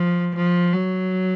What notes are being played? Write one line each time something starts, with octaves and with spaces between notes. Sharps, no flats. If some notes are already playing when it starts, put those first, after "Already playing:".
Already playing: F3
F3
F#3